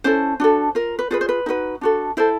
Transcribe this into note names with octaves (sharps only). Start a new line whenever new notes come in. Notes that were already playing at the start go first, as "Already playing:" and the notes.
C#4 E4 A4 C5
D4 F#4 A4
F4 A#4
B4
F4 G#4 B4 C5
C5
B4
D#4 F#4 B4
D4 F#4 A4
E4 A4 C5